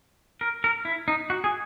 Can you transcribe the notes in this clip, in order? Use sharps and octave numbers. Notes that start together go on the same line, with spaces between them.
A#4
A#4
E4
D#4
F#4
G#4